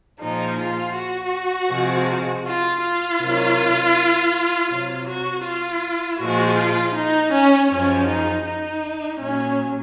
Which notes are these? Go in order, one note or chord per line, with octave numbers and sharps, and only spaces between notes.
A#2 F3 G#3 D#4
F4
F#4
C3 F3 G#3
F4
F4
C3 D#3 F#3
C3 F#3 F4
F#4
F4
A#2 F3 G#3 F#4
F4
D#4
C#4
F#2 F3 G#3 C#4
D#4
D#4
A#2 F#3 C#4